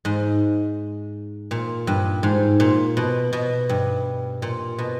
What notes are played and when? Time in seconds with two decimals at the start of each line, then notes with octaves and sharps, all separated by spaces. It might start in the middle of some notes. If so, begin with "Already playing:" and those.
0.05 G#2
1.51 A#2
1.87 G2
2.23 G#2
2.60 A#2
2.97 B2
3.33 B2
3.69 G2
4.42 A#2
4.78 B2